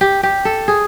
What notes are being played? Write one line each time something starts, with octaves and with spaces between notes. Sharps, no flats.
G4
G4
A4
G#4